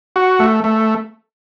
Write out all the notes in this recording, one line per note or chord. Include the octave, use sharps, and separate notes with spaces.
F#4
A3
A3